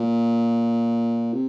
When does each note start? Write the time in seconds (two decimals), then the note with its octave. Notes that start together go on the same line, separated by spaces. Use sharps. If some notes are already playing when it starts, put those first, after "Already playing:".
Already playing: A#2
1.33 C3